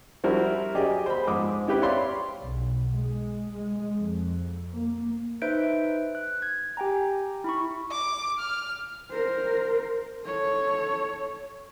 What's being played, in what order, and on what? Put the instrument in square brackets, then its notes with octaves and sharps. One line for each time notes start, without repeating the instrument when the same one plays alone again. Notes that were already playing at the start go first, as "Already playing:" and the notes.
[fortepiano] F3 G3 E4 F#4 A#4 C5
F#3 G4 G#4 D5 D#5
C5 B5
G#2 F3 G#3 D6 D#6
C4 E4 G4 B4
C#5 D5 F5 B5 C6
[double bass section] B1
G#3
G#3
F2
A#3
[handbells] D#4 B4 C5 E5 G6 D7
F#6
G#6
G4 G5 G#5 A#5
E4 B5 C#6
[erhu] D6
F6
[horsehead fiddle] A#4 C5
A4 C#5